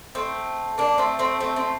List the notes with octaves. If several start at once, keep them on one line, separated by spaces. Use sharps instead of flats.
A3 C4
A#3 D4
A3 C4
A3 C4
A3 C4
A3 C4